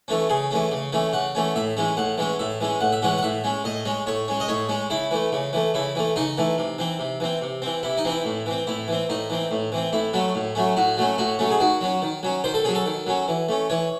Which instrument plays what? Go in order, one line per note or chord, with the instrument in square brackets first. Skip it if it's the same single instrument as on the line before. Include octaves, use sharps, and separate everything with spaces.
[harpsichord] E3 A3 C#4
C#3 G#4
E3 A3 C#4
C#3
E3 A3 C#4
C#3 F#5
E3 A3 C#4
A2 E5
E3 G#3 C#4
A2 F#5
E3 G#3 C#4
A2 E5
E3 G#3 C#4
A2 F#5
E5
E3 G#3 C#4 F#5
F#5
A2 E5
G#3 C#4
A2 D#5
G#3 C#4
A2 C#5
G#3 C#4
D#5
A2 C#5
G#3 C#4
C#3 E4
E3 A3
C#3
E3 A3
C#3 E4
E3 A3
C#3 D#4
E3 A3
C3
E3 C4
C3
E3 C4
C3
E3 C4
C3 E4
D#4
E3 C4
E4
A2
E3 C4
A2 E4
E3 C4
A2 D#4
E3 C4
A2
E3 C4
A2 E4
F#3 A3 C#4
A2
F#3 A3 C#4
A2 F#4
F#3 A3 C#4
A2 F#4
F#3 A3 C#4
G#4
D#3 F#4
F#3 C#4
D#3
F#3 C#4
D#3 C5
A4
F#3 C#4 G#4
A4
D#3
F#3 C#4
E3
A3 C#4
E3 C#5